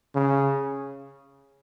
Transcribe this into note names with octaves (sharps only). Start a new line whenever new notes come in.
C#3